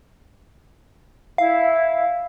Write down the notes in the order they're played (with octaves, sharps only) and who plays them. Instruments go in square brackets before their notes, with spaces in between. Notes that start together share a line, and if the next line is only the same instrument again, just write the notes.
[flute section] E4 [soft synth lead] F5